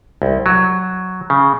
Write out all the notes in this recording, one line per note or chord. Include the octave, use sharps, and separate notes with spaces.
C2
F#3
C#3